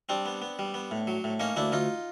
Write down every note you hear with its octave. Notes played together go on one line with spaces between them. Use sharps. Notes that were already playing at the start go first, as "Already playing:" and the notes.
G3 C4 D4
B3
B3
G3
B3
A2
F#3
A2
A#3 C#4 D#4
D2 D4 E4
D2 D#4 F4